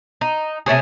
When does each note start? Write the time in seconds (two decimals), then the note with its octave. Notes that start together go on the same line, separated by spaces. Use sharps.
0.21 D#4
0.66 C3 A3 C#4 G#4